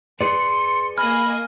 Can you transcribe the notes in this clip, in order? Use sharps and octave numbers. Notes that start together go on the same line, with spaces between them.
G#4 B4 D5 C6 C#7
A#3 D#5 G#5 B5 F6